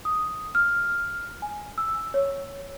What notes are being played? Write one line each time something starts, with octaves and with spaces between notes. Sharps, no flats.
D#6
F6
G#5
E6
C#5